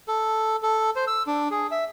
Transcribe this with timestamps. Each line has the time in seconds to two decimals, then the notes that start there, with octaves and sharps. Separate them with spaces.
0.08 A4
0.63 A4
0.96 C5
1.07 E6
1.27 D4
1.51 G#4
1.71 E5